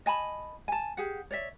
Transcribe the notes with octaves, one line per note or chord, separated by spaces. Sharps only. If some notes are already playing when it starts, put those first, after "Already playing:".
D#5 G#5 A5 B5
G#5 A5
G4 G#4 F#5
C#5 D5 E5